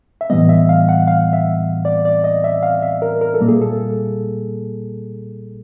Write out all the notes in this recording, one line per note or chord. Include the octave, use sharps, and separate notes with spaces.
E5
A2 E3 G3 B3 D#5
E5
F5
F#5
F5
E5
D5
D5
D#5
E5
F5
E5
A#4
A#4
A4
A#2 G3 A#3
G#4
A4